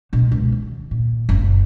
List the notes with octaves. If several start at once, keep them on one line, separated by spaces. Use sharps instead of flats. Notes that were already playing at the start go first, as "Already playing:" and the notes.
B2 B3
C#2
D#3
A#2
F#1 C#3